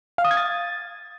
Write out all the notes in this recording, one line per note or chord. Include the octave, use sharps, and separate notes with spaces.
F5
D#6
G#6
A6